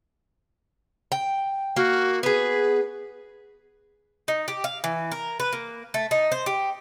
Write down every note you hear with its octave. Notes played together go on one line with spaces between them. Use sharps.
G5
A#3 F#4
B3 G#4 B4
D#4
G4
F5
E3
A#4
B4
A#3
A3
D#4
C5
G4